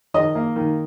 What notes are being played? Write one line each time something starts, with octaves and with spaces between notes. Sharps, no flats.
D#3 D#5
A#3
D#3